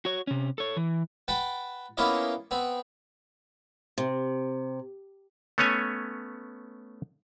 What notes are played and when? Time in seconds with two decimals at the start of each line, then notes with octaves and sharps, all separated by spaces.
0.05 F#4 C#5
0.27 C3 C#4
0.58 A4 C#5
0.77 E3
1.28 B4 F#5 G5 A5
1.97 A#3 B3 C#4 E4 F4 D#5
2.51 B3 C4
3.98 C3
5.58 A3 B3 C#4 C#5 G#5